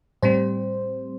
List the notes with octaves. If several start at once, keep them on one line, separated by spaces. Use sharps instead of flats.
A2 G3 C4 C5